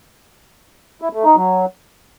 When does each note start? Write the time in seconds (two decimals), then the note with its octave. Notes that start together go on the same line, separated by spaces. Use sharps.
1.02 E4
1.13 A3
1.24 D#4
1.36 F#3